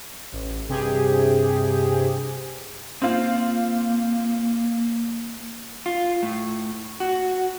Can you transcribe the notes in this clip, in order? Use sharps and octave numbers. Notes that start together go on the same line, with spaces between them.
A1
G2 C3 G4 G#4
A#3 C4 F4
F4
A2
F#4